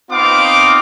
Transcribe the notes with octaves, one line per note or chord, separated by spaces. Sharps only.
B3 C4 D#4 F4 F5 D6